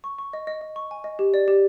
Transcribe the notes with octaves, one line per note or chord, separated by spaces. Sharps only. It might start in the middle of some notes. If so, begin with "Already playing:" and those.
C#6
C#6
D#5
D#5
D#5
C#6
G#5
D#5
G4
D5
G4